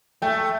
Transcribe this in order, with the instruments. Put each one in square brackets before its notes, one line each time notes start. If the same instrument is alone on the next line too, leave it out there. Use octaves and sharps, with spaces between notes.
[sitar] A3 [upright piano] G5